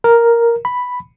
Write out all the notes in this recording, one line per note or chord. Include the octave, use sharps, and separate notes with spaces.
A#4
B5